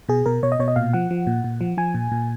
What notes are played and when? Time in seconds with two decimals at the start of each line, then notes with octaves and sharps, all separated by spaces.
0.09 B2 G#4
0.26 B2 A#4
0.43 B2 C#5
0.52 D#5
0.60 B2 C#5
0.68 D#5
0.76 A#2 F5
0.93 F3 F#5
1.11 F3
1.27 A#2
1.44 A#2
1.61 F3
1.77 F3 G#5
1.95 A#2
2.12 A#2